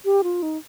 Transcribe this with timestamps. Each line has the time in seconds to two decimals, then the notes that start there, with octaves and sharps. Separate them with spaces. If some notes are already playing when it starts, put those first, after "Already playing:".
0.05 G4
0.24 F4
0.43 D#4